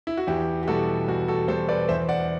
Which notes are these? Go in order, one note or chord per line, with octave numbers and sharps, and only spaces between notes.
E4
F#4
E2 E4 G4
G4
B2 G3 F#4 A4
E2 F#4
F#4 A4
B2 G3 A4 C5
B4 D5
E2 C5 E5
D5 F#5